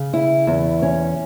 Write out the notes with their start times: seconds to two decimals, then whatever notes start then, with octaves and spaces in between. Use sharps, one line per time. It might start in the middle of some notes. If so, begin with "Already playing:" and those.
Already playing: C#3
0.13 E4
0.47 E2
0.82 C#4